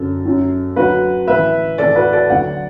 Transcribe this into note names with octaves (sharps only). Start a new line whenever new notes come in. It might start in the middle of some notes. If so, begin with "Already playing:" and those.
Already playing: F#2 D3 F#3 A4
F#2 F#3
D2 D3 F#3 F#4 B4
A2 E3 B4 E5
A2 E3 A4 D5
F#4 B4
A4 D5
D2 D3 F#3 D5 F#5